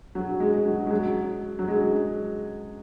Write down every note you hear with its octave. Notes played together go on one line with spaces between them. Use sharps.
F#3
G#3
F#3
G#3
F#3
F#3
G#3